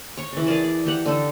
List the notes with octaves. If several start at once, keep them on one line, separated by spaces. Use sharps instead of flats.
C#5 C#6
C#3 E3
G#4 A#4 D5 A5
D5
E3 G4 F#5
D3 D#4 A4